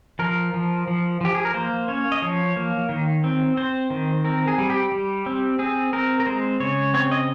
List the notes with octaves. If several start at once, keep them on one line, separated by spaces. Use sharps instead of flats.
F3 A#4
F3
F3
F3 G4
G#4
A#4
A#3 C5
C#4 C#5
D#5
F3 C#5
A#3
D#3
C4
C4 C5
D#3
C4 A#4
G#4
G3
G4
G3
C4
C4 G#4
C4 A#4
A#4
G#3 C5
C#3 C#5
C4 C#5
D#5